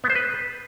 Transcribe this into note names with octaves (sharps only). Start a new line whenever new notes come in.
B3
C5
B4